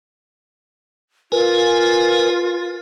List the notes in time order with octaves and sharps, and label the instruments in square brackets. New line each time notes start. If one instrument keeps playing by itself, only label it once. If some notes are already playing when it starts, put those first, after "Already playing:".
[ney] F4 [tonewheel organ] A#4 B4 G#5